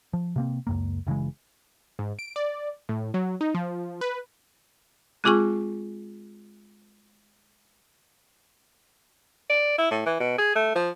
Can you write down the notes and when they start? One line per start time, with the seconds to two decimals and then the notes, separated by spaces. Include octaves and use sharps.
0.13 F3
0.36 C3 A#3 C4
0.67 C#2 F#2 A#3
1.07 F#1 C#3 E3 G#3
1.99 G#2
2.19 D7
2.36 D5
2.89 A2
3.14 F#3
3.41 D#4
3.54 F3
4.01 B4
5.24 G#3 C4 F4 G#4 G#5 C#6
9.50 D5
9.78 E4
9.91 A2
10.06 E3
10.20 B2
10.39 G#4
10.56 A3
10.75 F3